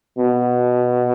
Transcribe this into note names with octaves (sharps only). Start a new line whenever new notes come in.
B2